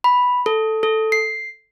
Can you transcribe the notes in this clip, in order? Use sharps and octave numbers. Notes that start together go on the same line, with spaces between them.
B5
A4
A4
C7